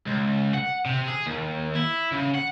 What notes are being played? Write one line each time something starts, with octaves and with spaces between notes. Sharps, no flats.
C#2
F#5
C3
G#4
D#2
E4
C#3
F#5